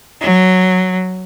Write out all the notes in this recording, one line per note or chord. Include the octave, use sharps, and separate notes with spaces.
F#3